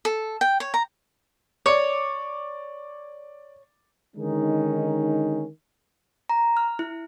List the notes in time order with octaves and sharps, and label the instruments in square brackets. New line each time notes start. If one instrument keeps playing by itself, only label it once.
[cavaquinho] A4
G5
C#5
A#5
[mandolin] C#5 [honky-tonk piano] D5 D6
[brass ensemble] D3 D#3 G#3 C#4 D#4
[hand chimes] A#5
F6
E4